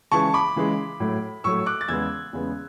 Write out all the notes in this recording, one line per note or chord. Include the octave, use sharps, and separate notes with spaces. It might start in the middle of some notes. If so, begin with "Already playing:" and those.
C#3 E3 G#3 A5 C#6
B5 D6
C#3 E3 G#3
A2 F#3 A3
A2 F#3 A3 C#6 E6
D6 F#6
A6
E2 C#3 G#3 B3 E6 G#6
E2 C#3 G#3 B3